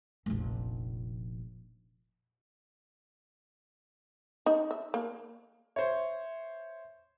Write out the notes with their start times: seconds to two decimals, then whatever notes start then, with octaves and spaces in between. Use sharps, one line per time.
0.26 F1 A#1
4.46 D#4
4.71 E5
4.94 A#3
5.76 C5 C#5 E5